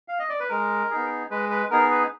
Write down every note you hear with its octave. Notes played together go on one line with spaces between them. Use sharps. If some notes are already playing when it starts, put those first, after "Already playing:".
F5
D#5
D5
B4
G#3 A#4
B3 D#4 G#4
G#3 B4
B4
B3 D#4 G#4 A#4
B4